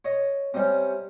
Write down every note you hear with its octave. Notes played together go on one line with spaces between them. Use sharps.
C#5 D#5
C3 G3 C#4